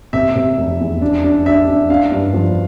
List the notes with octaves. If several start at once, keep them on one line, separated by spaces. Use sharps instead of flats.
C3 E5
C3
F1
E2
D4
D4
D4 E5
D4
D4 F5
G2
F3